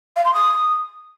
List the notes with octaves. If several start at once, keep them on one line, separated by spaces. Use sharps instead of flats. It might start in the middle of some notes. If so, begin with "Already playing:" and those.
F5
C6
D#6